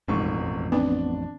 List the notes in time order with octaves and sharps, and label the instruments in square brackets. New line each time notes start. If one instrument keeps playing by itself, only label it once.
[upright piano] E1 G#2 C#6 [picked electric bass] A1 F2
[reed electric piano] B3 [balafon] C4 [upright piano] D4